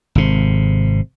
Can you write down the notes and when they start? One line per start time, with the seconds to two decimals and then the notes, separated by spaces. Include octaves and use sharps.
0.15 G#1 C3